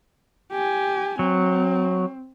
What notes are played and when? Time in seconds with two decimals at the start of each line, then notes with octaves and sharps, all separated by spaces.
0.52 G4 G#5
1.19 F#3 C4